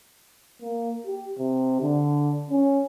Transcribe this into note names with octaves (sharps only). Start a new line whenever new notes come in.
A#3
G4
C3
D3
C#4